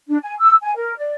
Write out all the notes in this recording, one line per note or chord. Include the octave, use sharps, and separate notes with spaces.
D4
G#5
E6
G#5
A#4
D5